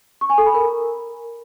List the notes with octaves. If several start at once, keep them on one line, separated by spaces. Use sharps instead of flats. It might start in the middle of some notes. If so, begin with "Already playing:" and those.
C#6
G#5
A4
B5
A#4